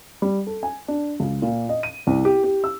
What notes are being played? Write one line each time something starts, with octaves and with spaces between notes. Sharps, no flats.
G3
A4
G#5
D4
C#2
A#2
D#5
D#7
C2
G4
G4
E6